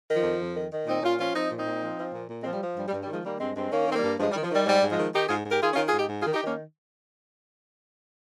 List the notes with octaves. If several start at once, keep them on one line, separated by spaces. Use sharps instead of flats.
D#3
F3
F2
F2
D#3
D#3
A#2 C4 D#4
A#2 C#4 F4
F3 C#4 F4
F3 C4 D#4
A#2
C4 D#4
A#2
F3
F3
A#2
A#2
G#3 C4
F3
G3
F3
G2 G3
G3
G2
G3
D#3 F3 G#3
D#3 G3 A#3
G2 G#3 C4
G2 G#3 C4
D#3 A#3 C#4
D#3 C4
G3 A#3
G2
G2 F3 G#3
G3
D#3
F3
D#3 G3
G#2 G3
G#2
F3 G#3
D#3
D#3 D#4 G4
G#2 F4 G#4
G#2 G4 A#4
D#3 F4 G#4
C#4 F4
D#3
F4 G#4
G#2 D#4 G4
G#2
F4 G#4
D#3
D#4 G4
D#3 A#3 C#4